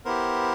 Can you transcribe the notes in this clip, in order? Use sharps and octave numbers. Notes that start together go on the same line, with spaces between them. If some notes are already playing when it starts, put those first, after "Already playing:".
B3 E4 G4 A#4 C5